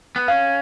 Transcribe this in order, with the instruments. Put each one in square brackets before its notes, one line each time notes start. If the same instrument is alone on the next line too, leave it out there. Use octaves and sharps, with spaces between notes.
[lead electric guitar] B3
[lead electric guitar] C#4 [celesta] F5